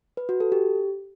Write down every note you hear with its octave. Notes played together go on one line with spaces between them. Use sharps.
B4
F#4
A4
G4